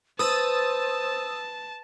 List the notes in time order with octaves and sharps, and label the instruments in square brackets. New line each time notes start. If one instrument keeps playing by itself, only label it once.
[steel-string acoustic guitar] B4 [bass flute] C5 [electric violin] A5 [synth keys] D#6 E6 A6